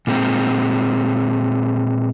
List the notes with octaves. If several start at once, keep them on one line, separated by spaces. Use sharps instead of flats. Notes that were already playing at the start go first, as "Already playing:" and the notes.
A#2 G#3 C4